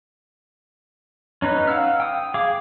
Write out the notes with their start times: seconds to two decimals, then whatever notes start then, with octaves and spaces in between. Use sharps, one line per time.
1.42 C#4 D#4 B4
1.68 F5 F#5 E6 F6
2.00 G5 D#6
2.34 G#4 F5 D6